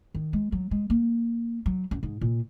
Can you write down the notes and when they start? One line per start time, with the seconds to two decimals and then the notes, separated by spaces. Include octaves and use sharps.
0.15 D#3
0.33 G#3
0.52 F#3
0.71 G#3
0.90 A#3
1.66 F#3
1.91 F#2
2.03 G#2
2.21 A#2